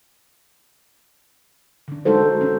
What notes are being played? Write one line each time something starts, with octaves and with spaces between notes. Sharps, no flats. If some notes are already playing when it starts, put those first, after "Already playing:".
D3 D4
D#3 G#3 D#4 F#4 A4 C5
G#3 C#4